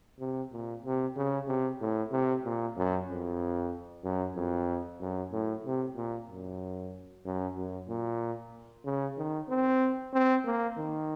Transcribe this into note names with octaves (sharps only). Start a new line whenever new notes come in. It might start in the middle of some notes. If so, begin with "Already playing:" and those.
C3
A#2
C3
C#3
C3
A2
C3
A#2
F#2
F2
F#2
F2
F#2
A2
C3
A#2
F#2
F#2
F#2
A#2
C#3
D#3
C4
C4
A#3
D#3